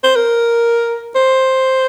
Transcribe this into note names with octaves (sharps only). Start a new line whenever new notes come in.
C5
A#4
C5